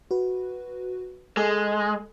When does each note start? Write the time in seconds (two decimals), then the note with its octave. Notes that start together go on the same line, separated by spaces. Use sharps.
0.11 F#4 B4
1.37 G#3 A4